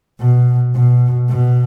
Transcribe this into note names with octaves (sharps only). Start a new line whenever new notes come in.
B2
B2
B2